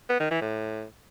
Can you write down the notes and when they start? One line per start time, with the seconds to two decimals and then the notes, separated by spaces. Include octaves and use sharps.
0.10 B3
0.20 D#3
0.31 E3
0.41 A2